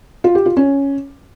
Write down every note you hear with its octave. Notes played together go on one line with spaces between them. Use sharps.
F4
G4
F4
C#4